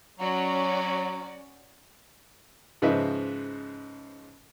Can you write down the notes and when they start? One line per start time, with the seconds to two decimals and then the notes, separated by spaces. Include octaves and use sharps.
0.20 F#3 C#4 F#4 D5
2.82 G#2 C#3 F3 D#4 B4 E5